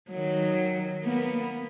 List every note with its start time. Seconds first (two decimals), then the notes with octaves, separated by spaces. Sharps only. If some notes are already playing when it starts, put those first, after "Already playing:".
0.11 D#3 F#3
1.04 A#3 B3